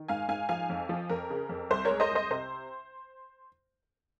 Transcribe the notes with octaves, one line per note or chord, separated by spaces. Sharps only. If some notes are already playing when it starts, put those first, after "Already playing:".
Already playing: D#3
G#2 F5 G#5
G#2 F5 G#5
F3 F5 G#5
F2
F3
F2 A#4
C#3
F2
C2 C5
A#4 C#5
G#3
C5 D#5
C2 C5 D#5
C3 C5